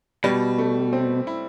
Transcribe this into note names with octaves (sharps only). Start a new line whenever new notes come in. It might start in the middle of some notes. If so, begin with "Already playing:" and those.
B2 G3
A3
C4
E4